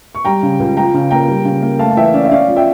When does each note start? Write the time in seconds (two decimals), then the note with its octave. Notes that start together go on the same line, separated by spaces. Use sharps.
0.15 C#6
0.25 G3 G5 A#5
0.43 C#3
0.59 C#2
0.77 F3 G5 A#5
0.94 C#3
1.11 A#3 G5 A#5
1.28 G3
1.45 C#3
1.62 A#3
1.79 A3 F5 A5
1.91 A5
1.97 E3 E5 G5
2.14 C#4 D5 F5
2.25 E5
2.31 C#4 D5 F5
2.48 F3
2.56 E5 G5